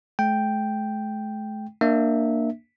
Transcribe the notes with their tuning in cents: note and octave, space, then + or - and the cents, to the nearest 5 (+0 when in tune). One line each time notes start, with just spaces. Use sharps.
A3 -45 G5 +0
A#3 +0 D4 +20 E5 -15